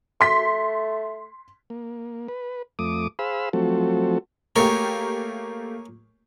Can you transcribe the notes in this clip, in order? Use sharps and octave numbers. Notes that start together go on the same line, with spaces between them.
A3 C6 B6
A#3
B4
F2 A3 D6 D#6
G#4 C5 F5 B5 E6
F3 F#3 A3 C4 F#4 A4
A3 A#3 G4 G#4 A#4 C#5